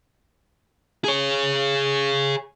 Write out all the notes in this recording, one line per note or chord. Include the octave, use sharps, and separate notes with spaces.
G#4 C#5